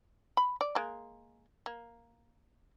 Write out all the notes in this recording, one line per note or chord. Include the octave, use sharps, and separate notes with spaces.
B5
D5
G#3 A#3
A#3